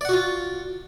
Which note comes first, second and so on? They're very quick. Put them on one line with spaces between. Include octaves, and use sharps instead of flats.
D5 F#5 F#4 F4